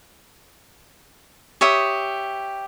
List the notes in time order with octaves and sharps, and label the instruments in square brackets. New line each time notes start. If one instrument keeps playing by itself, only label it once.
[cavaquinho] G4 C#5 E5 D#6